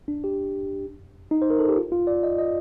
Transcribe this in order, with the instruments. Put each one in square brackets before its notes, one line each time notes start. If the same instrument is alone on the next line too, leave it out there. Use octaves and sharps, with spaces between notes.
[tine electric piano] D4
G4
D#4
C5
A#4
A4
G4
F4
F4
D5
D#5
D#5